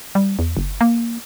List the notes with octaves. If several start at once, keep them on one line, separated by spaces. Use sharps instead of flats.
G3
E2
F#1
A#3